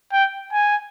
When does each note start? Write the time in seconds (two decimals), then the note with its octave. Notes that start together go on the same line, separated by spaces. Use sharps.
0.12 G5
0.53 G#5